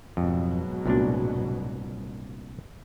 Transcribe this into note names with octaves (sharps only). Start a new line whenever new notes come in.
F2 G#2 B2 F#3
C2 A#2 A3 B3 D4 F#4